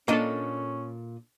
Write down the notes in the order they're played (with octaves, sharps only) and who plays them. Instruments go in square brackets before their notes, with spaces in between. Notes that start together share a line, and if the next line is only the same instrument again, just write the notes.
[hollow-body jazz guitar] A#2 D#5 [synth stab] A#3 D4 A4 [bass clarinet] C#4